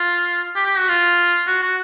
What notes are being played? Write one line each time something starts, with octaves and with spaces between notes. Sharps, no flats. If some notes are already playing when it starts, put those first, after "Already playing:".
Already playing: F4
G4
G4
F#4
F4
F#4
F#4